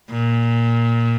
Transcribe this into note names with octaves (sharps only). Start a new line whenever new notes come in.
A#2